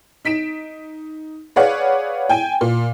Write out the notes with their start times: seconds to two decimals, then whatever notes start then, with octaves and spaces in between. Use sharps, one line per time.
0.25 D#4 B6 D7 E7
1.56 G#4 B4 C#5 D5 F5 F#5
2.29 G5 G#5
2.61 A#2